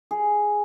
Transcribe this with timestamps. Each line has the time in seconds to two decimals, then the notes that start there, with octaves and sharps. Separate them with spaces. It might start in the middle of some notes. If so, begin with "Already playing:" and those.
0.11 G#4